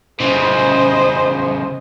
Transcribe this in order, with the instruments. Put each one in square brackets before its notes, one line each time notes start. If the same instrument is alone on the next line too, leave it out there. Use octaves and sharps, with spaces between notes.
[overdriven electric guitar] C#3 E3 [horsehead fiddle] C5 D#5